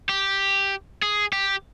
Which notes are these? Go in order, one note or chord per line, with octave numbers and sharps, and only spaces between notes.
G4
G#4
G4